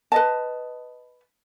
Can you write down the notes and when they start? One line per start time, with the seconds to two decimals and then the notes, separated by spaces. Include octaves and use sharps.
0.12 B4 D#5 A5